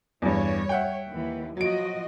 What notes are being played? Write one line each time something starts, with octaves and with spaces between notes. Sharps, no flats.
E2 G2 G3 C#5
E5 F#5 G5
D#2 E3
F3 F#3 F#4 D#5 D7